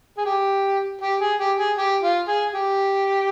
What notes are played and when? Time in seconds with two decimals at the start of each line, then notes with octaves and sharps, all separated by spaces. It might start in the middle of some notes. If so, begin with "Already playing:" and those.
0.18 G#4
0.25 G4
1.02 G4
1.21 G#4
1.39 G4
1.59 G#4
1.78 G4
2.03 F4
2.28 G#4
2.54 G4